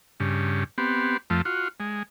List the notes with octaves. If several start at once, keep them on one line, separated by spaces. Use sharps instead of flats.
G2 C#3
B3 C4 G4
F2 F3 A3
F4 F#4
G#3